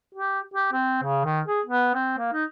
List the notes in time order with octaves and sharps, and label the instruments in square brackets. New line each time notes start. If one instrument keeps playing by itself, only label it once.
[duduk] G4
G4
C4
C#3
D#3
G#4
B3
C4
A#3
D#4